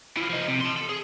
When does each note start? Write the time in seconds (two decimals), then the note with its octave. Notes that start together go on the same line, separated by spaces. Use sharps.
0.17 E3 F3
0.30 F3 D#4
0.48 C3
0.61 A5 C6
0.77 A4
0.89 G#4